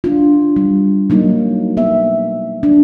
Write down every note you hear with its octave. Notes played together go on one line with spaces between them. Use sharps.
D4 F4
G3
F#3 A#3 D#4
B3 E5
D4